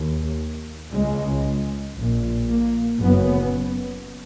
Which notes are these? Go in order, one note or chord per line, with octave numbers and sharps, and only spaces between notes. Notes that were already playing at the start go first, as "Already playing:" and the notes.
Already playing: D#2
C#2 C#3 G#3
A#1 A#2
A#3
F#1 F#2 C#3 B3